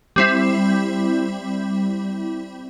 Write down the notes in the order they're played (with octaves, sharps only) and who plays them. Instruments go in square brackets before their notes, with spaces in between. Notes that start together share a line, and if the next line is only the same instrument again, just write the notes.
[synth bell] G3 C4 E4